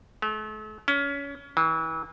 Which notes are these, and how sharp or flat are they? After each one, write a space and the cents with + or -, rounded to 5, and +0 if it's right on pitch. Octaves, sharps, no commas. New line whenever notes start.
A3 -40
C#4 +25
E3 -35